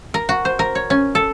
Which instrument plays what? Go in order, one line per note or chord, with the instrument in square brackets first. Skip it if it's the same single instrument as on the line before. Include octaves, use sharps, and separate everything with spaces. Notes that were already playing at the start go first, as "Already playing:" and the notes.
[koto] A#4
F#4
C5
A#4
C#5
C#4
A4